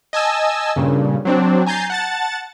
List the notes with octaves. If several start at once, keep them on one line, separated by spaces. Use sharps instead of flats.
D#5 G#5 A5 E6
G2 A#2 C#3
F#3 C4 D4
G#5 A#5 G6 A6 C7
F#5 A5 A6